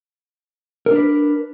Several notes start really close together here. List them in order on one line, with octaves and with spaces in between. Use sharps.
A#4 D4 B4